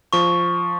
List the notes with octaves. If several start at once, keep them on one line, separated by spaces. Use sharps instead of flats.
F3 C#6